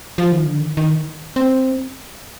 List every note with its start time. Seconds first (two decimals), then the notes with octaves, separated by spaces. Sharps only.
0.18 F3
0.32 D#3
0.46 D3
0.60 D#3
0.77 D#3
1.36 C4